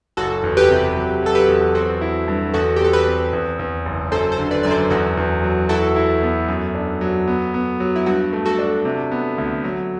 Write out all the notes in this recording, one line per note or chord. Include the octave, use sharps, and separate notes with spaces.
F#1 F#4 A4
E2
G4 B4
C3
F#3
F#3 A4
G4 B4
E2
C4 F#4 A4
E4
G2
E2 F#4 A4
G4
C4 A4
G4 B4
C4
E2
E2
F#1
F#2 A4 C5
A4 C5
D3
B4 D5
F#2 D5
A4 C5
E2 F#4 A4
E2
F#3
E4 F#4 A4
E4
B3
F#2
D4
F#3
B3
B3
F#3
E4
G2 F#4
A3
F#4 A4
D4
C3
B3
D2
F#3